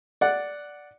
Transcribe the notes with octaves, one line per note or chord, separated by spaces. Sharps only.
D5 F#5